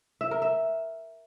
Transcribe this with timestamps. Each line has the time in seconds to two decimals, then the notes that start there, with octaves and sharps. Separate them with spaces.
0.21 E5
0.31 A#4
0.42 E5